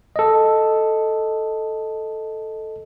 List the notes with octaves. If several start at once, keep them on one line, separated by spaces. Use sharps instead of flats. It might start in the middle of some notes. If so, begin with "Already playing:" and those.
A4 D#5